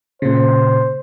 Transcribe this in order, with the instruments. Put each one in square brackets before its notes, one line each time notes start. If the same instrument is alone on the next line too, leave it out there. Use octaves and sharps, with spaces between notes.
[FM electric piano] A#2 C#3 [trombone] C5